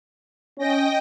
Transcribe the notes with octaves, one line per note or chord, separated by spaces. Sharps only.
C#4 D#5 G5 A#6